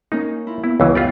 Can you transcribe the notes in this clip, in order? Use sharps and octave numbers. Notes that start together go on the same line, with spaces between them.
A#3 C#4 D#4 A#4
E4 F4
B3 E4
C#2 E3 F#3
E4 F4 G4 D5 F#5 G5